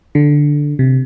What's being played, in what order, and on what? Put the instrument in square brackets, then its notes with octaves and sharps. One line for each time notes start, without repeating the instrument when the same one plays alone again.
[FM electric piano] D3
C3